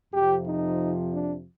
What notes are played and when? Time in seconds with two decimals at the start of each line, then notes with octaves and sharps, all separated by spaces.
0.13 F2 C3 F3 G4
0.47 D#4
1.13 D4